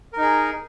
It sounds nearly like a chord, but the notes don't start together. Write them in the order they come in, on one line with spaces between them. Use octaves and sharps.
A#4 D#4 G#4